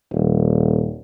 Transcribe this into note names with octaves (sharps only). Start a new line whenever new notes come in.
D#1